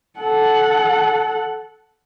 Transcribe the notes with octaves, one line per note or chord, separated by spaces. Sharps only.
A4 F#5